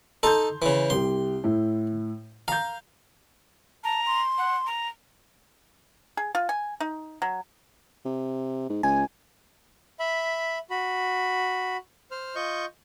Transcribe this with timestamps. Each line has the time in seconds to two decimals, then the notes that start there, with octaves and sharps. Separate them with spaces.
0.23 D#4 A4 C6 G6
0.62 C#3 E3
0.90 C2 G4 C6
1.44 A2 E4
2.48 F5 A#5 G6
3.84 A5 A#5
4.06 C6
4.38 F#5
4.67 A#5
6.17 G#4
6.35 F4
6.49 G#5
6.80 D#4
7.22 F#3
8.05 C3
8.70 G#2
8.83 C#2 G#5
10.00 E5 B5
10.70 F#4 B5
12.11 C5 F6
12.35 F4 D#5 C#6 G6